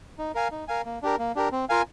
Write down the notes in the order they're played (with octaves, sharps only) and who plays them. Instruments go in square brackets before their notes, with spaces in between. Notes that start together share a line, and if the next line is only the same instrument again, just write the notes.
[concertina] D#4
A#4 F5 G#5
D#4
A#4 F5 G#5
A#3
D4 G4 A#4
A#3
D4 G4 A#4
C4
F4 A#4 F5 G#5